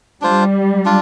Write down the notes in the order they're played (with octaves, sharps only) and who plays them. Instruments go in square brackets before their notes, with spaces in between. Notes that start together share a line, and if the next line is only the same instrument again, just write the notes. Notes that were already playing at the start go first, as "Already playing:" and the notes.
[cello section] G3 [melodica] D4 F4 C5
[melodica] D4 F4